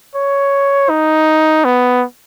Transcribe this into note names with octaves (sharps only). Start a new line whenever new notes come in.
C#5
D#4
B3